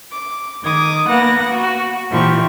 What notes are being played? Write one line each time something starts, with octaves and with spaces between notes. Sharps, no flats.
D6
D#3 D6 D#6 G#6
A#3 B3 F#5 A#6
F#4
A#2 E3 F3 G4 C#6